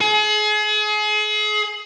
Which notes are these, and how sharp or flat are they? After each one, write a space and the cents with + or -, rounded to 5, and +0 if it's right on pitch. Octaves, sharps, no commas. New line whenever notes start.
G#4 +35